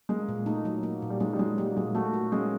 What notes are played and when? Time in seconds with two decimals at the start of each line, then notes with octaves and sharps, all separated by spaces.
0.09 G#3 A#3
0.28 A#2
0.46 A3 D#4
0.65 F#3
0.83 A#3
1.02 A#2
1.10 G3
1.20 G#3 D#4
1.33 G3
1.39 F#3 G#3
1.58 G3 A#3
1.76 A#2 G#3
1.95 A3 F#4
2.14 A#3
2.32 G#3 C#4